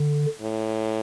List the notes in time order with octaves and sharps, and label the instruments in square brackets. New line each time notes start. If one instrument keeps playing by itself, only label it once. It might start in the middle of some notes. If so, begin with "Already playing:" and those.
Already playing: [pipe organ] D3
[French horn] A2